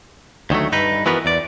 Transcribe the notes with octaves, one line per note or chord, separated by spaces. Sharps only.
D2 D#3 F#3 A3
G2 D#4 B4
E3 F3 B3 F#4 A#4 B4
E2 D5